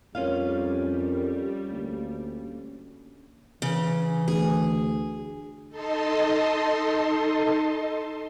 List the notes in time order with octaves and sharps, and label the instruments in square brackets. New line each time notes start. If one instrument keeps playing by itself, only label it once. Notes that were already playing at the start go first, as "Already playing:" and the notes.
[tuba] F2 [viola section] G3 [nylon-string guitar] C#4 F4 F5 [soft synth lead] A#4
[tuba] D2 [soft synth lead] A#3
[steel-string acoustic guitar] C#3 [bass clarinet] E3
[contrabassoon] D2 [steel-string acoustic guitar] G#4
[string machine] D#4 A4 D#5 A5 C6